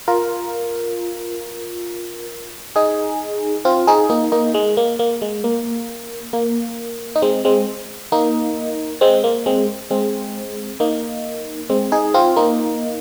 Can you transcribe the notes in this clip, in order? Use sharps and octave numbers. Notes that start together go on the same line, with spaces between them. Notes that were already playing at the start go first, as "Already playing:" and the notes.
F4 A#4
D#4 G#4
C4 F4
D#4 G#4
A#3 D#4
A#3 D#4
G#3
A#3
A#3
G#3
A#3
A#3
D#4
G#3 C4
G#3 C4
A#3 D#4
G#3 C4
A#3
G#3 C4
G#3 C4
A#3 D#4
G#3 C4
D#4 G#4
C4 F4
A#3 D#4